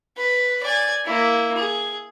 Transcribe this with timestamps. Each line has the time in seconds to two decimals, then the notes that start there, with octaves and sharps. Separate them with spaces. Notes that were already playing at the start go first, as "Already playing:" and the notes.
0.17 B4
0.63 D5 G#5
1.05 A#3 E4
1.57 G#4